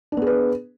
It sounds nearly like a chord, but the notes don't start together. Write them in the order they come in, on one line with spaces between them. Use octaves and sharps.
D4 B3 G#4 B4